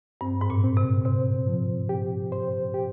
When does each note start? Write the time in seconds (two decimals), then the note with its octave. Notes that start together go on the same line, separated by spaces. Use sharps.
0.21 G2 C4
0.41 G#2
0.50 A#2
0.64 C4
0.77 C3
1.05 C3 C5
1.47 F3
1.89 G4
2.32 C5
2.74 G4